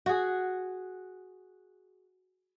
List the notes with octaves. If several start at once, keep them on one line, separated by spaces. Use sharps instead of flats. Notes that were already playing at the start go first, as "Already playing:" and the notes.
F#4 G#4